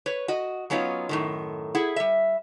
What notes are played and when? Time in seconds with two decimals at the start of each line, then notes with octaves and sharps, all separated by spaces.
0.06 B4 C#5
0.28 F#4 D#5
0.70 F#3 B3 C#4 D#4 F4
1.09 F#2 A2 D#3
1.75 E4 G#4 F#5
1.96 G3 E5